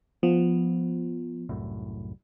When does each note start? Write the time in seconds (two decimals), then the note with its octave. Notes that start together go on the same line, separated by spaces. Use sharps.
0.23 F3 B3
1.49 C2 F#2 A2